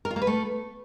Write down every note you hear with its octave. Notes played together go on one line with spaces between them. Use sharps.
A#4
F4
A#3
B4
A3